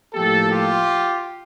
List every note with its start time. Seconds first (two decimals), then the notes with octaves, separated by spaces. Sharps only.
0.14 A2 F3 A#3 G4 A4
0.51 F4 G4